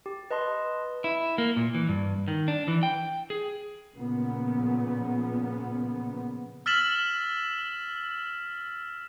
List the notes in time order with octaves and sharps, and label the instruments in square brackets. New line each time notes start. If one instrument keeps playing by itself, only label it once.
[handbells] G4
B4 D#5 A5 C6
[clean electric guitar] E4
A#3
A#2
E3
G2
D#3
D4
E3
G5
G#4
[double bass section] A#2 C#3 F3 B3
[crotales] E6 F6 A6 B6 E7 F#7